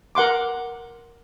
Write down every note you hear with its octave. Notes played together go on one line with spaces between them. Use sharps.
A#4 F#5 C6 D6